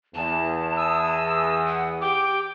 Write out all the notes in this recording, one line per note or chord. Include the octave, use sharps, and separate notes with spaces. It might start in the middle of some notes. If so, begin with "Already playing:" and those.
E2 A5
D#6 E6
F#5
G4 G5 D6